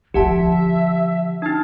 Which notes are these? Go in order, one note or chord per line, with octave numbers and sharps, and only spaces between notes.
D3 F3 G4 E5 F#5 A5
D4 D#4 A5